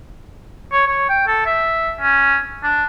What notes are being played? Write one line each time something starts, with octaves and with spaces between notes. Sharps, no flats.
C#5
C#5
G5
A4
E5
C#4
D4